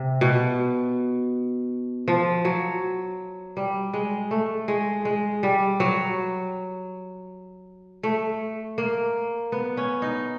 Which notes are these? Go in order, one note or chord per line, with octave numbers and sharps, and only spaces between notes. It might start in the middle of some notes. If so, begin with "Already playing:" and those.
Already playing: C3
B2
F3
F#3
G3
G#3
A3
G#3
G#3
G3
F#3
A3
A#3
B3
C#4
D#4